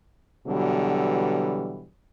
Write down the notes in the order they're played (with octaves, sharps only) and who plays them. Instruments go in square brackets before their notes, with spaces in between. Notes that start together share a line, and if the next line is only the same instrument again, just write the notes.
[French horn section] B2 D3 E3 F#3 G3